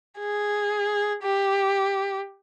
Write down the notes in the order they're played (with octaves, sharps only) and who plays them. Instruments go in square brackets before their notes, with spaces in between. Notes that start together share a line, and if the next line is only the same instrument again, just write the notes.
[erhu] G#4
G4